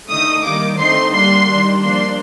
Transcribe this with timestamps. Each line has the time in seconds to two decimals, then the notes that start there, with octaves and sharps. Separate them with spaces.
0.09 D3 A3 D#4 D#6
0.43 D#3 G3 A#3 D#4 D6
0.78 D3 A3 C4 D#4 C6
1.12 D3 G3 A#3 D4 C6
1.47 D#3 G3 D4
1.80 F3 A#3 D4 C6